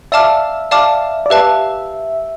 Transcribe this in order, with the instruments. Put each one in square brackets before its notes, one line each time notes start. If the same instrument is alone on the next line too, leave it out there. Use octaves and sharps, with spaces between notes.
[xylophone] D5 F5 A5 D6 F6 [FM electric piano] E5
[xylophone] D5 F5 A5 D6 F6
[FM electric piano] D5
[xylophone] G4 B4 F5 A5 [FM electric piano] E5